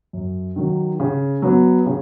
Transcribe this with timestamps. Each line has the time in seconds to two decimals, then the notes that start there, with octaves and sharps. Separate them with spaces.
0.13 F#2
0.56 D#3 F#3
1.00 C#3
1.42 F#3 B3
1.86 C#3